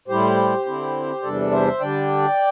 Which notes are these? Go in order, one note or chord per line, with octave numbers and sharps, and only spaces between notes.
A2 G3 E4 G4 C5
D3 C4 E4
E2 C3 E3 G3 D4 A4 D5
C5 E5
D3 G3 D4 D5 G5